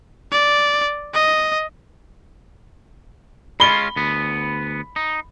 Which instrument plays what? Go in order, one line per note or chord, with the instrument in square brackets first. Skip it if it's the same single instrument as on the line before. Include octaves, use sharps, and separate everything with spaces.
[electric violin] D5
D#5
[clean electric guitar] G#3 C#4 F4 [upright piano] B5 G7
[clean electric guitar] D2 B3
D#4